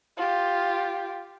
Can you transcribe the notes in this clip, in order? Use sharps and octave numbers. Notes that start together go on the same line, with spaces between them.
F4 G4